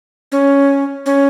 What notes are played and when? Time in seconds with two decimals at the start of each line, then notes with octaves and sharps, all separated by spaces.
0.32 C#4
1.06 C#4